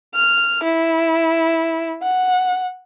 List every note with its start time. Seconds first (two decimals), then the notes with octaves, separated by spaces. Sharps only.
0.14 F6
0.64 E4
2.02 F#5